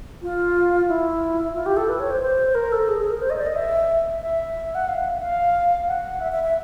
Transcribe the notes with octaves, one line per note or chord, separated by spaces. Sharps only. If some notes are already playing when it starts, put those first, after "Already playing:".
F4
E4
F4
G4
A4
B4
C#5
C5
C5
A#4
A4
G#4
G#4
A#4
C5
D#5
D5
D#5
E5
E5
F#5
F5
F5
F#5
E5
E5
E5